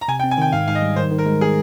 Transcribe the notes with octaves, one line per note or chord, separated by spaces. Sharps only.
A#5
C3 G#5
G5
C4
G#5
D#3 G5
G#2 F5
G#2 F5
D#5
G3
D#3 C5
D#3
A#4
G#3
G#4